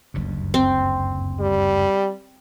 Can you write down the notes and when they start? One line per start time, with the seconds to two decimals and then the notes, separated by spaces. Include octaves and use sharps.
0.14 F#1 D2 G2
0.54 C4
1.40 G3